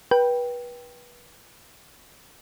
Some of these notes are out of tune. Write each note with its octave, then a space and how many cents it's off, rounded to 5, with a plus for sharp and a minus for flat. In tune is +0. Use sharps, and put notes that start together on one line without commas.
B4 -25 G5 +0